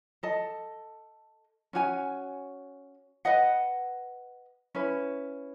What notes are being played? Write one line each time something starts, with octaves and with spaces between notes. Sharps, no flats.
A4 D#5 A5
C#4 F#4 C#5 G#5
B4 D#5 F#5
C#4 E4 B4